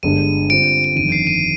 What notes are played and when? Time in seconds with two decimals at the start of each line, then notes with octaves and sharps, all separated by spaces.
0.03 G1 G2 D3 G#3 D4 D#7
0.50 D3 G3 C4 F4 D7
0.84 D7
0.96 G1 F2 D#3 D#7
1.12 C7
1.27 D#7